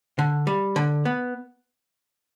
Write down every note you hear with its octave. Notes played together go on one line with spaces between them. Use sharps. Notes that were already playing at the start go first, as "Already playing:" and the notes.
D3
G3
D3
B3